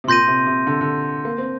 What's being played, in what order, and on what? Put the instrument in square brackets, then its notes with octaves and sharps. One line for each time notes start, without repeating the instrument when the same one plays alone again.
[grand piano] C3
[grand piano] A#2 [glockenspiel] C6 G6 A#6 D#7
[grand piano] C3
C3
D3
D3
A#3
C4